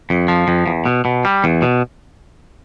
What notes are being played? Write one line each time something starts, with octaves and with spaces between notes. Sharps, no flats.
F2
F3
F2
E2
B2
B2
G3
E2
B2